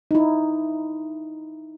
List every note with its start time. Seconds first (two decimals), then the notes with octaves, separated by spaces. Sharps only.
0.11 D#4 E4